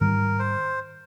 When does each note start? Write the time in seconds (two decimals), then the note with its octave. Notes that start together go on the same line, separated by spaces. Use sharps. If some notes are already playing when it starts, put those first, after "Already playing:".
0.01 G#2 D#3 G3 A#4
0.39 C5